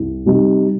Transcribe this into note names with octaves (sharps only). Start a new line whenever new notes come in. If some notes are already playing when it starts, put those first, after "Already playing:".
Already playing: C2
C3 G3 C4 D#4